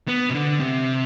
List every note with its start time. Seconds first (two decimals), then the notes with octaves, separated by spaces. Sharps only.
0.08 B3
0.30 C3
0.34 D3
0.60 C3